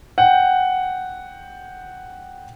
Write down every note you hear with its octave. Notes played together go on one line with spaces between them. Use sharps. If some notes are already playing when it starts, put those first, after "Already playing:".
F#5 G5